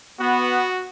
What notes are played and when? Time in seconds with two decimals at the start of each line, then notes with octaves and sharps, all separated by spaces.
0.20 B3 F#4